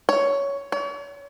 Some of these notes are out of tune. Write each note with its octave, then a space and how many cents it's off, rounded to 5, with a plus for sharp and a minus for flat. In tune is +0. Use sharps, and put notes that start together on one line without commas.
C#5 +10
C#5 +40